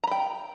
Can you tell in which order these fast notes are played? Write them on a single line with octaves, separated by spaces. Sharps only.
A#5 B5 G5